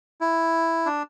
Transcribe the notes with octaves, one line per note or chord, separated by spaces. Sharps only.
E4
D4